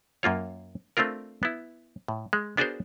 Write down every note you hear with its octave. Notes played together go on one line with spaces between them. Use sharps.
F#2 A#3 F4 C#5
A3 C4 D4 F4 A#4
B3 E4
A2
G#3
B3 D4 F#4 G#4 A#4 C5